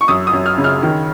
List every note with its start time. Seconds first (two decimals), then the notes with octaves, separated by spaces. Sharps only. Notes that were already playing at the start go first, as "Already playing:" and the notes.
0.01 C#6
0.08 F#2 D#6
0.27 D#6
0.33 F#2
0.46 F6
0.58 C#3
0.64 F6
0.83 D#3